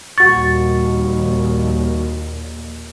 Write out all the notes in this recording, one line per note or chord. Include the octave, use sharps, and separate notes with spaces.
A#1 D#2 A#2 G3 F#4 C#6 A6